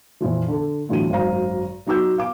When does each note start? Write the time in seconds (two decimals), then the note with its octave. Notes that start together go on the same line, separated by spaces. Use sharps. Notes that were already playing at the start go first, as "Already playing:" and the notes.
0.21 F2 A#2 E3 F3
0.48 D3 A4
0.89 A2 D3 E3 F#3 F4 D#7
1.10 G#1 F#2 C5 F5 A#5
1.87 F#3 D#4 F#4 D6 E6 G6
2.18 F5 D6